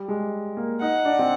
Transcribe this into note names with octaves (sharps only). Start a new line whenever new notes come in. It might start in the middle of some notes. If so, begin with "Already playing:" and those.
Already playing: G3
G#3
A#3
D#4 F#5
D4
C4